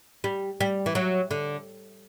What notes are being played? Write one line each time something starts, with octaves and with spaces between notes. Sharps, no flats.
G3
G3
E3
F#3
D3